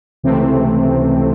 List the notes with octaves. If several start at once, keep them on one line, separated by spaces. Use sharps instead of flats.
C#2 C3 E3 A3 C4